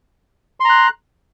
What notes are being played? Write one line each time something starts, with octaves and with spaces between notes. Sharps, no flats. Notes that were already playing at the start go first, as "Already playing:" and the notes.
A#5 C6 F#6